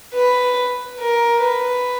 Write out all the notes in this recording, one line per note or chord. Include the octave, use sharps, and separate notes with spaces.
B4
A#4
B4